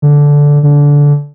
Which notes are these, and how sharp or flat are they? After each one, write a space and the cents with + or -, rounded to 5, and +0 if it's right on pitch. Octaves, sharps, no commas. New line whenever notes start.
D3 -10
D3 -20